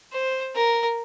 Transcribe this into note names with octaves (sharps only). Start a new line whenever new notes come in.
C5
A#4